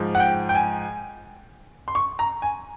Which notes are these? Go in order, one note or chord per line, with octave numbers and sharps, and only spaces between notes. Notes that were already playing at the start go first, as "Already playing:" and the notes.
Already playing: G#2 F3
F#5
G5
G5
G#5
C6
C#6
A#5
G#5